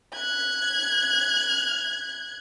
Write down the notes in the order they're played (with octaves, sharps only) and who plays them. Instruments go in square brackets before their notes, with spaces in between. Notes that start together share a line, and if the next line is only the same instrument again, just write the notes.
[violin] F#6 G#6